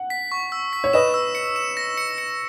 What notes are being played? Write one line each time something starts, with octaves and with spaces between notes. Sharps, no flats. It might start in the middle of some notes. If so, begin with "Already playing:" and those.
Already playing: F#5
B6
C#6
E6
B6
C#5
B4 D#5 E7
E6
C#7
E7
A#6
C#7
C#7